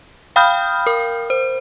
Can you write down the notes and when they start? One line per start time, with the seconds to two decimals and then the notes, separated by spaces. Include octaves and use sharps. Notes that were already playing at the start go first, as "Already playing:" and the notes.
0.36 F5 G5 B5 D#6 F6 G6
0.87 A#4
1.30 C5